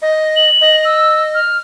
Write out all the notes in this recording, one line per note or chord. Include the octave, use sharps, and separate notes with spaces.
D#5
F#7
D#5
E6
F6